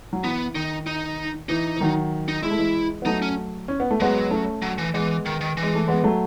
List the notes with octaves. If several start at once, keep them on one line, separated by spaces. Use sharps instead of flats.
F#3
E3 B3
D#3 D#4
D#4
E3 D#4
E3
D#3 F#3
D#4
G#3 E4
A3
E3 G#3
B3
F#3 A3 D#4
C#4
C#4
B3
A3
F#3 G#3 B3
A3 C#4
F#3
E3
E3 G#3 B3
D#3
D#3
E3
G#3
A3
G#3 B3
F#3 A3